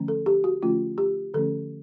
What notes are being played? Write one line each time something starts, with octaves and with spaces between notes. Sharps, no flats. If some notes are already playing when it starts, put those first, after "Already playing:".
Already playing: D3 F3 A3 C#4
A4
G4
F#4
D3 F3 A3 C#4 F4
G4
D3 F3 A3 C#4 A4